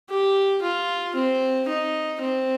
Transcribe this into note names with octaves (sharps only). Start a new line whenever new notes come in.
G4
F4
C4
D#4
C4